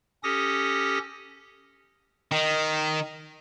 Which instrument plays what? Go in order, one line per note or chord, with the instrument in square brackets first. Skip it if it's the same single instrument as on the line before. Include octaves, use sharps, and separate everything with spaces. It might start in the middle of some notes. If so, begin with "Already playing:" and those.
[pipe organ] C#4 G4 A4 D#6 A#6
[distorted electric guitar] D#3